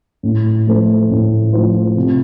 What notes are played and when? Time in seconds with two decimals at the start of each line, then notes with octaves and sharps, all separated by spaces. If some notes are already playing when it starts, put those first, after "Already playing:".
0.23 A2
0.67 F3 A3 F4 C5
1.10 A2
1.53 F3 A3 F4 C5
1.96 C3